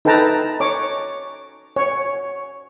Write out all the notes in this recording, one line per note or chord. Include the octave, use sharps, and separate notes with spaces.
D#4 A4 B4 G5 A5 A#5
C#5 D6
C#5